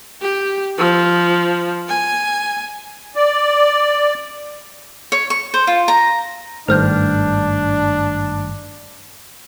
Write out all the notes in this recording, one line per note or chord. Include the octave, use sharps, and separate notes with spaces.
G4
F3
G#5
D5
C#5
C#6
C5
F4
A#5
G#1 G2 D#3 A3 D4 C5 F6 G6